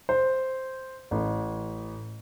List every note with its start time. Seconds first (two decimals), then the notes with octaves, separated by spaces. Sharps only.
0.09 C5
1.11 A1